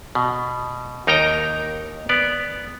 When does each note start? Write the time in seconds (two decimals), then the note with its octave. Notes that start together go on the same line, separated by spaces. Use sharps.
0.15 B2
1.07 D#2 D#4 A#4 C#5 G5 A#5
2.09 B3 D5